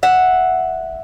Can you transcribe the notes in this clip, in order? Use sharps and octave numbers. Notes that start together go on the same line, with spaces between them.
E5 F#5